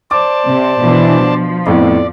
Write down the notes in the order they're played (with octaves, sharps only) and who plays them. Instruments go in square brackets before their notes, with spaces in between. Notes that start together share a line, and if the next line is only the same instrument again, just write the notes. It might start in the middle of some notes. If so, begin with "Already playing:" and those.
[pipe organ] C5 D5 A5 [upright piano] D6
[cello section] C3
B2 E3 D4
F3
[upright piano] F2 A2 B3 [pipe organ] D5